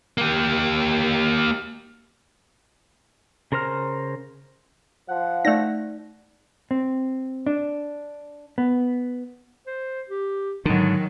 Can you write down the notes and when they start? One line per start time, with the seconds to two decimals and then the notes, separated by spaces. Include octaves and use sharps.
0.18 A#3 G4
3.52 C#3 A#4 C5 A#5 F6
5.09 F3 F#5
5.45 A3 D#4 D5 A#6
6.71 C4
7.46 D4
8.58 B3
9.67 C5
10.09 G4
10.66 G#2 D3 D#3 F#3 D#4